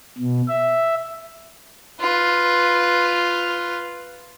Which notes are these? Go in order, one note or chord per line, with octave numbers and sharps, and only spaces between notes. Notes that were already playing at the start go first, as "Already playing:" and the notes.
B2
E5
F4 B4